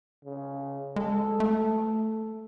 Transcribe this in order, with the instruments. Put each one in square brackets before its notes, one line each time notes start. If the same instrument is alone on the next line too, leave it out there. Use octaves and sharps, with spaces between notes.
[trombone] C#3
[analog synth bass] G#3 [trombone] A4
[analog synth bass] A3